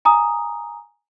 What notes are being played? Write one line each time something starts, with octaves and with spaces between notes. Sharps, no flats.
G#5 A#5 D#6